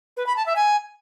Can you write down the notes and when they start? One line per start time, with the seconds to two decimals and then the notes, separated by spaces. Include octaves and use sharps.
0.17 B4
0.26 B5
0.36 A5
0.46 E5
0.56 G#5